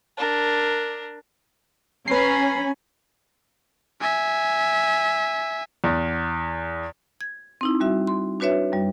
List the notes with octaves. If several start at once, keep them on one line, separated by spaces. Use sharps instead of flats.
D4 A#4
C#4 B4 G#5 A#5 B5 C7
E5 G#5
E2
G#6
C4 D#4 E4
G3 F#4 E5
C6
D4 F#4 B4 C#5 E5
F#2 G3